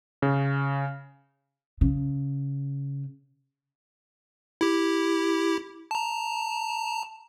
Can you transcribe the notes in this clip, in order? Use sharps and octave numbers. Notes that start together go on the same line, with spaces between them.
C#3
C#3
E4 G4
A5 A#5